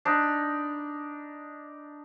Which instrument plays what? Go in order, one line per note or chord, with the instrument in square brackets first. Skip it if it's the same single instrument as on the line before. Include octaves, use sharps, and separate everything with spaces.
[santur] D4 D#4 B5